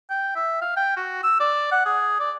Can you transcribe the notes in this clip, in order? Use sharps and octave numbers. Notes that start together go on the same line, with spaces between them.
G5
E5
F5
G5
F#4
E6
D5
F#5
G#4
D5